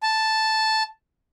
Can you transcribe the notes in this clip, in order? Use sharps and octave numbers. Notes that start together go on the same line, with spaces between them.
A5